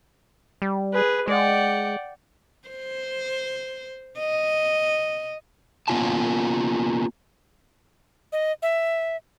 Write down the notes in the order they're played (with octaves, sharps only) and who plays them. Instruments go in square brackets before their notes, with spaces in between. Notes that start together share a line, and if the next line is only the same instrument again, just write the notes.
[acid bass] G3
[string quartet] G#4 B4
[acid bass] G#3 [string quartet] D5 F#5 G5
[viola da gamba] C5
D#5
[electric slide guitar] A#3 B3 C#4 F4 G#5 A5
[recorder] D#5
E5